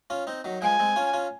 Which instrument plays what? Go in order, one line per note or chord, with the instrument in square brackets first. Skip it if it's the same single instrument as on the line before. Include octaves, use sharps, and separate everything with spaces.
[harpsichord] C#4 F4
C4 D#4
D#3 F#3
[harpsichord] F3 G#3 [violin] G#5
[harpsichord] G#3 C4
C#4 F4
C#4 F4